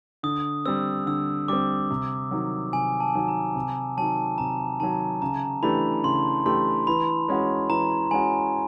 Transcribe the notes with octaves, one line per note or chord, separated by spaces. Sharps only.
D3 D#6
G3 C4 E6
D3 E6
G3 C4 D6
C3
D#3 F#3
C3 G#5
A5
G#5
D#3 F#3 A5
A#5
C3 A5
D#3 F#3 A5
C3 A#5
D#3 F#3 A5
C#3 A#5
E3 A3 D4 G4 B5
C#3 C6
E3 A3 D4 G4 C6
E3 B5
G#3 C#4 F#4
E3 A#5
G#3 C#4 F#4 G#5